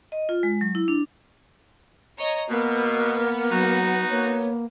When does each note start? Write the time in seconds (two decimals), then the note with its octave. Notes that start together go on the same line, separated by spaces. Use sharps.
0.12 D#5
0.29 F4
0.43 G#3
0.61 F#3
0.75 E4
0.88 D4
2.17 C#5 D#5 A#5
2.49 B2 A#3 B3
3.51 F#3 D#4 F#4
4.10 A#3 C#5